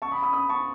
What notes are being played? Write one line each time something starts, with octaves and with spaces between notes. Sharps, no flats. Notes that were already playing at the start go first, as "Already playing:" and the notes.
A5 C#6
B5 D#6
B5 D#6
B5 D#6
A5 C#6